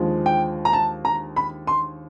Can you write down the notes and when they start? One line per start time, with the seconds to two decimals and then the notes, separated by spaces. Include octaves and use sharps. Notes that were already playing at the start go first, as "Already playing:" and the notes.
Already playing: D#2 D3 F3 G#3
0.26 G5
0.65 A#5
0.73 A5
1.05 A#5
1.36 B5
1.67 C6